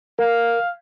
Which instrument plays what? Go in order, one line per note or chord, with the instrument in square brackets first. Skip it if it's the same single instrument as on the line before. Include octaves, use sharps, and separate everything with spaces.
[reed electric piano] A#4 [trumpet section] F5